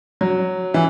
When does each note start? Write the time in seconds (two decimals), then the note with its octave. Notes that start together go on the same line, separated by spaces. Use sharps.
0.21 F#3
0.74 E3